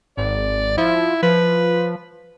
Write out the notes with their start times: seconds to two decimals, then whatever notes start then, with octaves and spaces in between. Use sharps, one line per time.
0.17 G#1 D5
0.78 F3 E4
1.23 F3 B4